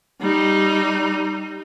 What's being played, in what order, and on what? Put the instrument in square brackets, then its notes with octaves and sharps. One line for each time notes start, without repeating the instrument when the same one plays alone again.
[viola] G3 D#4